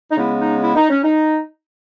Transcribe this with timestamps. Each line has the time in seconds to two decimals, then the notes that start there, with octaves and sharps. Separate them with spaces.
0.11 D#4
0.17 C#3 G#3 B3 E4
0.41 D#4
0.63 E4
0.76 D#4
0.90 C#4
1.04 D#4